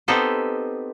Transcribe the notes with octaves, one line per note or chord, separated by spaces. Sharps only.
B3 C4 D#4 G4 A4 C5